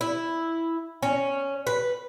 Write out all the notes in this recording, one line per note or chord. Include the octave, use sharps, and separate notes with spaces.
E4
C#4
B4